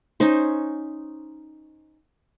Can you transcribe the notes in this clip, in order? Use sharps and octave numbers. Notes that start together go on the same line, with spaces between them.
C#4 D#4 C5